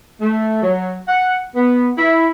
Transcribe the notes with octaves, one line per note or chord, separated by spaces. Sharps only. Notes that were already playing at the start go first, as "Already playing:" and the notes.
A3
F#3
F#5
B3
E4